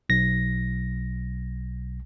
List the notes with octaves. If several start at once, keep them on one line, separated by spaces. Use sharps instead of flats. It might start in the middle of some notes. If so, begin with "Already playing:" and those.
B1 A#6